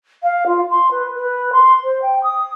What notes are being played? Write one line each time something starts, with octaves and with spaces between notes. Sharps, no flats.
F5
F4
C6
B4
B4
C6
C5
G5
D#6